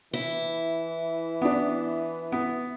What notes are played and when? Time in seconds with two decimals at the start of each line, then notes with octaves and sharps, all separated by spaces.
0.13 E3 E4
1.42 B3 D4
2.32 B3